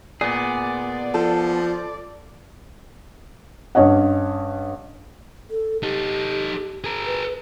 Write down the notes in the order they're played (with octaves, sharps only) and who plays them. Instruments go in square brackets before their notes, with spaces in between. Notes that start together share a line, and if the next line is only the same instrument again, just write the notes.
[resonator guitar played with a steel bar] A#2 [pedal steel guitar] B3 G#4 [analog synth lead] D5
[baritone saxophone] F3 [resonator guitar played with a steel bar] A4
[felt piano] G2 C#4 C#5 D#5 F#5
[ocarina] A4
[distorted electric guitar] D#4 A4 [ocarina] G4
[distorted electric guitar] G#4 A#4
[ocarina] B4